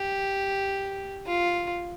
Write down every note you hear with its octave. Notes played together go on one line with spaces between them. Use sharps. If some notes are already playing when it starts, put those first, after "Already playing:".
Already playing: G4
F4